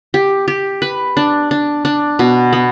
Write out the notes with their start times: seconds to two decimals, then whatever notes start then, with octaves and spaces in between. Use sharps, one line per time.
0.14 G4
0.48 G4
0.82 B4
1.17 D4
1.51 D4
1.85 D4
2.19 B2
2.53 B3